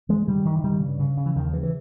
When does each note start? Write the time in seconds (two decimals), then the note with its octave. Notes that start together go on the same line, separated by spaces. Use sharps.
0.09 G2 E3 G#3
0.27 G2 D#3 G3
0.45 G2 D#3
0.59 E3
0.64 G2 D#3 G3
0.81 C#3
0.99 C#3
1.17 C#3
1.26 E3
1.36 D#2 D#3
1.53 C#3 E3
1.63 E3